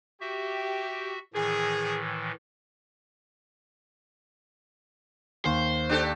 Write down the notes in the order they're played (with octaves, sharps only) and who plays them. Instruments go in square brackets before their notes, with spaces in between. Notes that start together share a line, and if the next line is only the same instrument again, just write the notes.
[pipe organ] F#4 E5 [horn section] G4
[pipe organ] A2 D#3 E3 [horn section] G#4
[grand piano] D#2 [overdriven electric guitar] C5
[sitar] D4 G4 A4